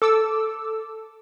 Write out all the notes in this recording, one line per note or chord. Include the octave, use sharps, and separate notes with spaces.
A4 D6 E6